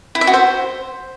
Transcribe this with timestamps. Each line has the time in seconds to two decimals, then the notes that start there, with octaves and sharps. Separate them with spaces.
0.15 E4
0.21 E5
0.27 F#4
0.34 C5